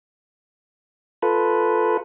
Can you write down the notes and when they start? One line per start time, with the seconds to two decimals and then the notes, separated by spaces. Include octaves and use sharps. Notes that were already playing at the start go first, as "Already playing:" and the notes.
1.22 F4 A4 B4